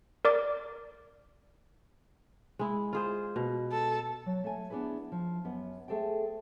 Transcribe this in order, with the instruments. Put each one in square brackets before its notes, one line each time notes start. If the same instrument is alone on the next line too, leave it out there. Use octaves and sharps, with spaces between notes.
[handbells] A#4 D5 D6 A6
[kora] G#3 E4
F4 G#4 C5
B2
[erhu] A4
[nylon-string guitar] F#3
A3 G#5
B3 D4 E4 G#4 B4
F3
F#2 B3
A3 G#4 A4 C5 G5